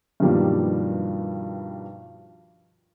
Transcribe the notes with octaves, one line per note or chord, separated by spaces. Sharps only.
G2 B2 D#3 F3 G3 A#3